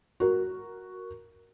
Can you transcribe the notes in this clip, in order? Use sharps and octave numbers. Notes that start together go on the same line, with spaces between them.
F#4 A#4